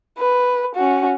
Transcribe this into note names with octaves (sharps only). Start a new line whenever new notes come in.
B4
C#4 F#4